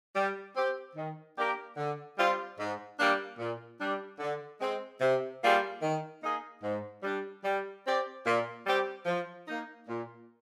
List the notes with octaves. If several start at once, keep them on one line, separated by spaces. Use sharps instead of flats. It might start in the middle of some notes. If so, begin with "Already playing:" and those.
G3
C4 G4
D#3
A#3 D4 G4 A#4
D3
G3 C4 F4
G#2
G3 A#3 D4
A#2
G3 D4
D3
G#3 C4
C3
G3 A#3 F4 G#4
D#3
A#3 D#4 G#4 D#5
G#2
G3 D4
G3
C4 G4 D5
A#2
G3 C4 G4
F3
A#3 D#4
A#2